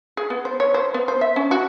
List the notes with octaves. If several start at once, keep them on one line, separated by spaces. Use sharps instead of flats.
G#4
B3
C5
C#5
C5
B3
C5
E5
C#4
F#4